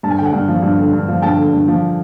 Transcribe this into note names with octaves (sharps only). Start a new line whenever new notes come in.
G2 A5
G#5
D3 G5
F#5 G#5
G2
F3
G2
D3
G2
F3
G2 G5 A5
D3
G2
F3